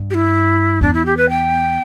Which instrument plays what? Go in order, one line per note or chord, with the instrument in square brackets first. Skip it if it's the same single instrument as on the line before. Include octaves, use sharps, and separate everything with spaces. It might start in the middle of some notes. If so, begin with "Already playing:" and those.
Already playing: [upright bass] G2
[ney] G4
E4
[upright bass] E2 [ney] D4
[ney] E4
G4
B4
G5